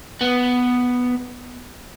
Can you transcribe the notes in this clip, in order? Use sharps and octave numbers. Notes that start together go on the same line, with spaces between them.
B3